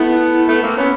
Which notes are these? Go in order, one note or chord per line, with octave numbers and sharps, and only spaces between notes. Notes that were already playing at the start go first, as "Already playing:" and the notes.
Already playing: A3 B3 E4
A3 B3
A#3 C4
B3 C#4